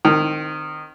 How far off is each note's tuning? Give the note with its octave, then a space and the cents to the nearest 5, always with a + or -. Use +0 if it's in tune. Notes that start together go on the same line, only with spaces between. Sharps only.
D#3 -20 C4 +0